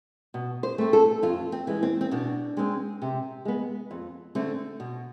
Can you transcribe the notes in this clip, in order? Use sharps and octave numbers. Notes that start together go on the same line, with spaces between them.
B2
C5
A3 C4
A4
F2 F4
C4
E3 G#3
C4
C4
B2 D4
G#3 C4
C3
G#3 B3
F2
D3 A3 C4
B2